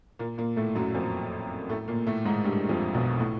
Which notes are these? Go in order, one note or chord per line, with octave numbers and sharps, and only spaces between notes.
A#2 A#3
A#2 A#3
A2 A3
F#2 F#3
F2 F3
A2 A3
A#2 A#3
A2 A3
G#2 G#3
G2 G3
F2 F3
B1 B2
A2